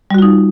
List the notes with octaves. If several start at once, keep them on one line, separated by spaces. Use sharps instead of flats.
G3 D#4 F4 F#4